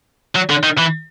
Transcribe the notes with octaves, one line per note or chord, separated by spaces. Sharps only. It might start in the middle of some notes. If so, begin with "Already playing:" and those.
F#3
D3
D#3
E3